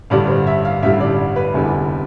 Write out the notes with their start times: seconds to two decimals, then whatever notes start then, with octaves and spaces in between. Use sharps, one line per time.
0.10 A1 G2 D3 G3 D5
0.28 C5
0.47 E5
0.65 F5
0.82 A1 G2 D3 G3 E5
1.01 D5
1.36 B4
1.54 F1 E2 D3 G3